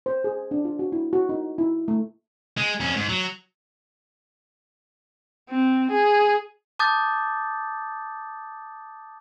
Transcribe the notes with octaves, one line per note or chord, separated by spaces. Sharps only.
C5
G#4
D4
F4
F#4
E4
F#4
D#4
E4
A3
G#3
F2 C#4
G#2
F#3
C4
G#4
A5 D6 D#6 G6 A6